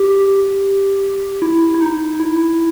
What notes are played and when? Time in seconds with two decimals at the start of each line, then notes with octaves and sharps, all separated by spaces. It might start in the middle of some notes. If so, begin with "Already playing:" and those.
Already playing: G4
1.42 E4
1.74 E4
1.81 D#4
2.20 E4